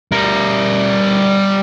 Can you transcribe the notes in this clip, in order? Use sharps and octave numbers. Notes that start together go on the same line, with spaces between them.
G3 A#4